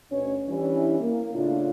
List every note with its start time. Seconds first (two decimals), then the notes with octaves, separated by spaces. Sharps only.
0.11 D2 B2 C#4 B4 C#5
0.49 E3 G3 C#4 D4 E4
1.00 A#3
1.34 A2 C#3 D4 E4 F4